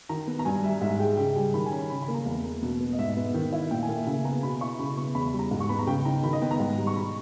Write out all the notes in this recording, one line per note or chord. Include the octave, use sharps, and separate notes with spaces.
D#3 A#5
B3
A#5
G2 G#5
G3 E5
G#2 E5
G#3 G5
C#3 G5
G3 G#5
D#3 B5
G#5
C#4 A#5
C#3 B5
B5
A#3
A#5
E2
A#3
B2
B3
D#5
G#2 E5
B3
D#3
E4
A#2 G5
G#5
A#3
E5
C#3 G#5
B3 A#5
B2 B5
E4 C#6
C#3 B5
B3 C#6
E2 B5
B5
G3
A#5
G#2
C#6
B3 B5
A#5
C#3 G5
D#4 A#5
D#3 B5
D#5
B3 G5
A#5
G#2
G3
C#6
B2 B5